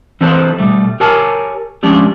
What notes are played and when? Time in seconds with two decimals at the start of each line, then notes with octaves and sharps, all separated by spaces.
0.21 E3 C4 D#4 A4 B4 C5
0.59 B2 G3 A3
1.00 G4 A#4 C#5 G#5 A5
1.83 F3 G#3 C#4 D4 G4